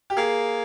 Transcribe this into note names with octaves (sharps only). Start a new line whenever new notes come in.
G4
A#3 G#4